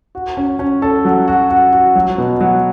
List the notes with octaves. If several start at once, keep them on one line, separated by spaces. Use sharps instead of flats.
F#4
C#4
C#4
A4
F#3
F#4
F#4
F#4
F#3
B2
F#3